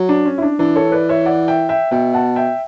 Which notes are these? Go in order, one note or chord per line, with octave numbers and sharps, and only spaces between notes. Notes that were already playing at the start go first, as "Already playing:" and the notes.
Already playing: F#3
D4
C#4
E4
D4
E3 D4
A4 C#5
B4 D5
C#5 E5
D5 F#5
E5 G5
E5 G5
B2 E5 G5
F#5 A5
E5 G5